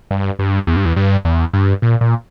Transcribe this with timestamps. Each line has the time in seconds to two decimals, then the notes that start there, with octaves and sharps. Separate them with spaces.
0.11 G2
0.39 G2
0.67 E2
0.76 G2
0.85 E2
0.96 G2
1.25 E2
1.54 G2
1.82 A#2
2.01 A#2